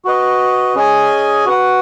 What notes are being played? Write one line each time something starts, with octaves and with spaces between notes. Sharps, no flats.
F#4 B4 D#5
C#4 G#4 D#5 G#5
F#4 B4 F#5